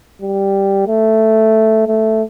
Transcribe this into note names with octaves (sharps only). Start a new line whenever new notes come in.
G3
A3
A3